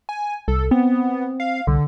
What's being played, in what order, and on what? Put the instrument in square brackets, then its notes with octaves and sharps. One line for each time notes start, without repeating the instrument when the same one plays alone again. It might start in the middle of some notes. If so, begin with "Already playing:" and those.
[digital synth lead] G#5
[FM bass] C2 [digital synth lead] A4
[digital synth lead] B3 [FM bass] C4
[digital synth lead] F5
[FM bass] C2 [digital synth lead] D3